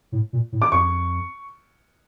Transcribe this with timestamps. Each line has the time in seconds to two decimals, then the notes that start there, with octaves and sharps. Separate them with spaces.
0.12 A2
0.33 A#2
0.52 A2
0.62 D6
0.72 F2 C#6